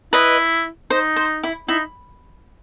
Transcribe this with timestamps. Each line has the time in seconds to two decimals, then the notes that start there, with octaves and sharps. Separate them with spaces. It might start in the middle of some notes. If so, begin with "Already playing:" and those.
0.13 E4 B4 D#5
0.90 D#4 C5
1.16 C5
1.43 E4
1.68 D#4 E4